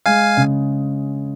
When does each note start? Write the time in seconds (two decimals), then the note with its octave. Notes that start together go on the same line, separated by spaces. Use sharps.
0.06 G#3 F5 G#5
0.37 C#3